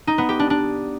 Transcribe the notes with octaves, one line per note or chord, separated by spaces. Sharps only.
D#4
B3
G4
D4
D4